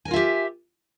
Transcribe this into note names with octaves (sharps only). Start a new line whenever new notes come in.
F4 G4 A#4 E5 G#5